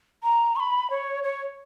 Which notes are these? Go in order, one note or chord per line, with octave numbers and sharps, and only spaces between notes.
A#5
C#6
B5
C#5
C#5